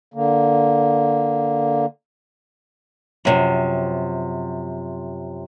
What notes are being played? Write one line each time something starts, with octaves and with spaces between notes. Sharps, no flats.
D3 A#3
F#2 C3 F3